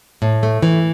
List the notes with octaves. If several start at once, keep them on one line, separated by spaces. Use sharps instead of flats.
A2
A3
E3